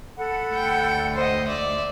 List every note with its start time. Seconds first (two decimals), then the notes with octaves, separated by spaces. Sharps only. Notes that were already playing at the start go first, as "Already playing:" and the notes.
0.17 A4 F#5 B5
0.53 D2 G5
1.15 C5 D#5
1.48 D5 E5